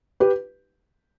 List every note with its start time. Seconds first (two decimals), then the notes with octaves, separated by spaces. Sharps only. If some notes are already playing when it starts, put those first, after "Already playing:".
0.20 G4 B4